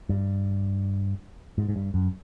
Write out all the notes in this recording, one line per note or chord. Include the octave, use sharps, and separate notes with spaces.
G2
G#2
G#2
G2
F#2